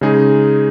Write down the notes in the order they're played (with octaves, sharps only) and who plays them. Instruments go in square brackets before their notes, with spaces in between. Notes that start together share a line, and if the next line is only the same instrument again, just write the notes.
[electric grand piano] C#3 G#3 D#4 G#4